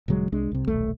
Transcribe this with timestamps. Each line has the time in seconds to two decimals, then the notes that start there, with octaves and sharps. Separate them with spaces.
0.08 D#1 C#3 F#3 G#3
0.32 C2 G#3 D4
0.52 C2 C3
0.67 D#1 B1 A3